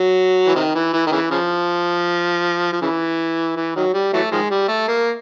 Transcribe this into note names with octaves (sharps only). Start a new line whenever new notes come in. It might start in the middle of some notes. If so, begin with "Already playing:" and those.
Already playing: F#3
E3
C3 D#3
E3
E3
D#3
C#3 E3
C#3 F3
F3
C#3 E3
E3
D#3 F#3
G3
E3 F#3 A3
D#3 F3 G#3
G3
A3
A#3